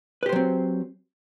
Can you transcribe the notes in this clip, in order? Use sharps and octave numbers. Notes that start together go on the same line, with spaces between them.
F#3 C4 G4 B4 C5